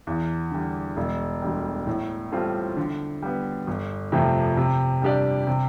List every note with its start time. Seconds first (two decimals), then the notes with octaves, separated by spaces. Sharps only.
0.07 E2
0.51 D3 G3
0.97 E1
1.42 D2 D3 G3
1.87 A2
2.32 G3 C4 F4 A4
2.77 D3
3.22 G3 B3
3.67 G1
4.12 F2 C3 F3 A3
4.57 C3
5.02 G3 D4 G4 D5
5.47 C3